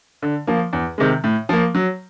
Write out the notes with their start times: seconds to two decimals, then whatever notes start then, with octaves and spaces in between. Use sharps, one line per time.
0.22 D3
0.47 F3 A#3
0.73 E2
0.98 C3 D#3 G#3
1.24 A2
1.49 F3 A#3
1.75 F#3